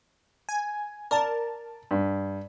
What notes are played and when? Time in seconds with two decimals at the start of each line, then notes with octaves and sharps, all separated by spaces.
0.49 G#5
1.11 A#4 D5 A5
1.91 G2